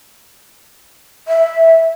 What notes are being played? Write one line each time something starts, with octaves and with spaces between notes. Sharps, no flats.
E5